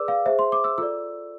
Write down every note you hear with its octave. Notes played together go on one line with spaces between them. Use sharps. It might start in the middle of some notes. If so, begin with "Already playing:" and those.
Already playing: G#4 B4 D5 D6 E6
F5
G#4 C5 E5
C6
D6
E6
F4 A4 D5 E6